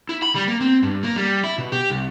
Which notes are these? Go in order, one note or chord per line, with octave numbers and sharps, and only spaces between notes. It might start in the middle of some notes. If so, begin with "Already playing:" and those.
E4
B5
G3
A#3
C4
G2
A#3
G3
E4
B2
G4
C2